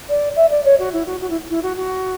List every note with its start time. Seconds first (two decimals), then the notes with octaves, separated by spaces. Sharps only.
0.09 D5
0.36 E5
0.50 D5
0.64 C#5
0.79 F#4
0.93 E4
1.06 F#4
1.21 F#4
1.30 E4
1.49 E4
1.62 F#4
1.76 F#4